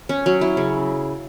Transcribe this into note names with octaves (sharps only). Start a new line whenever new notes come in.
C#4
F#3
E4
C#3